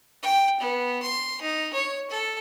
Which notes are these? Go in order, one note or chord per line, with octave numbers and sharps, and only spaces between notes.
G5
B3
C6
D#4
C#5
A4